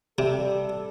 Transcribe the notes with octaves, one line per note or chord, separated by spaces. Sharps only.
C3 G3 A4